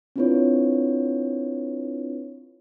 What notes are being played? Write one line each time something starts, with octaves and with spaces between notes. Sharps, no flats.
C4 D4 E4 F4 B4 C#5